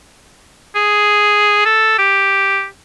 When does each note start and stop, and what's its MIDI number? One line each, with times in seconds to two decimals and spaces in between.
0.76 1.64 68
1.65 1.97 69
1.98 2.66 67